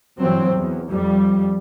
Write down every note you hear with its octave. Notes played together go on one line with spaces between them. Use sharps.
G1 E3 F#3 C4
E2
F2 G3